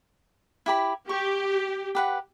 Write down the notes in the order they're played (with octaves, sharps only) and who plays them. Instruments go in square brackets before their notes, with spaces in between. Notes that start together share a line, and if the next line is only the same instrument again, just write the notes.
[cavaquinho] E4 G4 B5
[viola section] G4 [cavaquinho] C#6
[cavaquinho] G4 B4 F#5